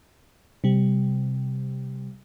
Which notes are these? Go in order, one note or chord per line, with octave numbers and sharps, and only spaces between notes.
C3 G3